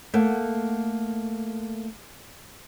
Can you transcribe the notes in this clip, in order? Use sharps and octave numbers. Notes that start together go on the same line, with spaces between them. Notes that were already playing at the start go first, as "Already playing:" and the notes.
A3 A#3 F#5